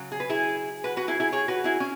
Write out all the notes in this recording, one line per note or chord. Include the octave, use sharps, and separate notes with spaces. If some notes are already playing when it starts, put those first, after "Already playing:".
Already playing: C#3 F#3
G#4
B4
E4 G#4
F#4 B4
F#4 B4
E4 G#4
E4 G#4
G#4 C#5
F#4 B4
E4 G#4
C#4